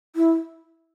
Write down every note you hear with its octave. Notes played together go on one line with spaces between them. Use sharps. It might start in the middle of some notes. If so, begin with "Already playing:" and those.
E4